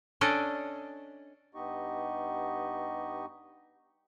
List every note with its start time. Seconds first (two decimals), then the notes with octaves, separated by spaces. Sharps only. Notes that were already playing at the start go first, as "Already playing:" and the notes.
0.21 C#4 D4 A4 D5 D#5
1.55 G2 B3 D#4 G4 D#5 C#6